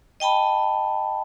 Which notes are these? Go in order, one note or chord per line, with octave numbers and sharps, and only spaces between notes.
D#5 G5 A5 B5